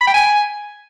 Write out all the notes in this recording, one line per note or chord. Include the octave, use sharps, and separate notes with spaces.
B5
G5
G#5